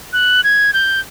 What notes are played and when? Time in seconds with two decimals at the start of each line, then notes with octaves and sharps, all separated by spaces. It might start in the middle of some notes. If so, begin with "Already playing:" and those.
0.13 F#6
0.44 G#6
0.74 G6